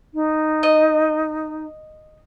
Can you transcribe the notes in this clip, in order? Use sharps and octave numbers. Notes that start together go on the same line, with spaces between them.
D#4
D#5